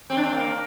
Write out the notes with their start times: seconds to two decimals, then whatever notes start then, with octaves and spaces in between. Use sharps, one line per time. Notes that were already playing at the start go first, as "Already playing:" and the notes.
0.10 C4
0.17 D4
0.24 C4
0.33 A#3